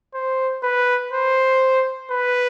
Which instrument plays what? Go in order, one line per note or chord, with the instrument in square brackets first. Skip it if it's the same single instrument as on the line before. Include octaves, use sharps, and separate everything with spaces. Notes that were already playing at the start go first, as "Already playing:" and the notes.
[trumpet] C5
B4
C5
B4